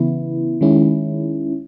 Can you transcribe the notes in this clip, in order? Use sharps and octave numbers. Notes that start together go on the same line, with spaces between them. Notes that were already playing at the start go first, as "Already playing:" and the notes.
Already playing: C#3 E3 B3 E4
D#3 G#3 C#4 E4